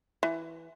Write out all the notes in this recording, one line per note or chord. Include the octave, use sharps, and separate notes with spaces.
E3